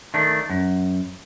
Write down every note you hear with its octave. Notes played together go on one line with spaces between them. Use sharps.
D#3 A3 D4
F#2